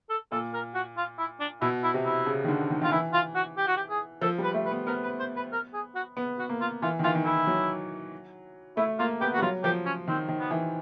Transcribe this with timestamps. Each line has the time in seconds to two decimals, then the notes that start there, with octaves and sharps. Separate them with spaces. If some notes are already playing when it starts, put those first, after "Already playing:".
0.09 A4
0.31 A#2 A4
0.53 A#4
0.75 F#4
0.97 F4
1.18 E4
1.40 D4
1.61 B2 E4
1.83 E4
1.94 C3
2.05 E4
2.26 C#3
2.44 D#3
2.48 D3
2.70 D#3
2.82 D#3 F4
2.91 E3 E4
3.13 F4
3.35 F#4
3.57 G4
3.67 F#4
3.77 G4
3.89 G#4
4.22 F3 A4
4.38 G3 B4
4.54 A3
4.65 B4
4.71 B3
4.87 B3 A#4
5.03 B4
5.19 C5
5.36 B4
5.52 A#4
5.74 G#4
5.95 F#4
6.17 B3
6.38 F#4
6.49 A#3
6.61 F4
6.82 E3 F4
6.99 D#3
7.04 E3 F4
7.15 D#3
7.25 E3 E4
7.47 F#3
8.77 A3 E4
8.99 A#3 F4
9.21 B3 G4
9.33 F#4
9.38 G3
9.42 F#3 F4
9.64 F3 G4
9.86 C#4
10.08 D#3 C4
10.28 D#3
10.39 B3
10.51 E3